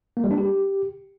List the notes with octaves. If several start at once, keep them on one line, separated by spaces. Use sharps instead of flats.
A#3
G3
D4
G4